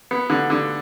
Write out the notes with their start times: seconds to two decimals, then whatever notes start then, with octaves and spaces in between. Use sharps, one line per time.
0.11 B3
0.30 D3
0.50 D3